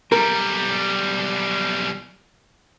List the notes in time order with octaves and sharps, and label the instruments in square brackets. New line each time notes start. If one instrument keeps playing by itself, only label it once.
[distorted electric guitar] B1 G3 [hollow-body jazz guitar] A#4